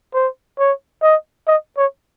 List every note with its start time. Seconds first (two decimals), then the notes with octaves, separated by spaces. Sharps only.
0.14 C5
0.59 C#5
1.02 D#5
1.47 D#5
1.77 C#5